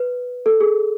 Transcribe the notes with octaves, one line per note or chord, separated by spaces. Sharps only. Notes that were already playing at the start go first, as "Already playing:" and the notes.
Already playing: B4
A4
G#4